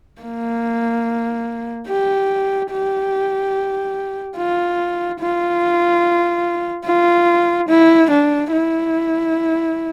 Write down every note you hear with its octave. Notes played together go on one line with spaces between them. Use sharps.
A#3
G4
G4
F4
F4
F4
E4
D4
E4